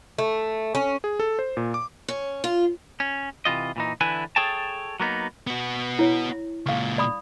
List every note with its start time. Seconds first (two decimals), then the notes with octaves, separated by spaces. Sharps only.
0.18 A3
0.75 C#4
1.04 G#4
1.20 A4
1.39 C5
1.57 A#2
1.74 D6
2.08 C#4
2.44 F4
3.00 C#4
3.45 C3 E3 F4 D#5
3.76 A#2 E3 D#4
4.01 D3 E3 E4 B4 G#5
4.36 G#4 A4 C#5 G5 A5
5.00 F#3 A#3 B3 D#4
5.47 B3 F#4
5.99 E4 C#5
6.66 C#2 A#2 F5 C#6
6.98 D5 B5 D#6